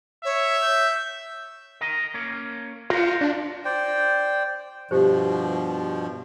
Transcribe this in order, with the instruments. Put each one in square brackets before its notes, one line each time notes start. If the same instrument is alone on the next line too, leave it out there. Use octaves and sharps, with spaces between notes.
[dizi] C#5 [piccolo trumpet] E5
[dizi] G6
[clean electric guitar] A#4 D#5
A#3 C#4
[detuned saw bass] F4 [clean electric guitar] F#4 A#4 C5
[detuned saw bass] D4
[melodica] C5 D5 G5
[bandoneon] G2 B2 F3 [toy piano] G4 C5